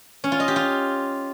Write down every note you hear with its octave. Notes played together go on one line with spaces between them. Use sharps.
C#4
F4
D#5
G4
F4